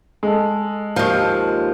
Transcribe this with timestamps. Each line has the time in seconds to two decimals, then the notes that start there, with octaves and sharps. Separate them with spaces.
0.23 G#3 A4
0.96 D#2 F3